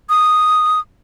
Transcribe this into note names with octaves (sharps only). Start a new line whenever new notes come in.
D#6